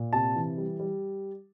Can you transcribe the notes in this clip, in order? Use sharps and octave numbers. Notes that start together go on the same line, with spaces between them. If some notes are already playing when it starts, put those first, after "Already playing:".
Already playing: A#2
C3 A5
E3
G3
G3